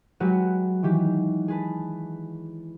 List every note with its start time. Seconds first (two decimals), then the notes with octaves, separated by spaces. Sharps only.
0.20 F#3 G#3 F#4 G4 B4 F#5
0.83 D#3 E3 G4
1.48 G#4 B4 A5